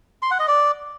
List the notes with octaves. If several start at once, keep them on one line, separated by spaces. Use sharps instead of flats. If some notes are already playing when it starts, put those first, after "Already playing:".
C6
F#5
D#5
D5